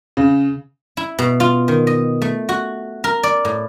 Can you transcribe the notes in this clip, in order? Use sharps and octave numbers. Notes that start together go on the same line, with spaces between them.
C#3
E4
B2
F4
D#3
D#5
A3
F#4
A#4
D5
A2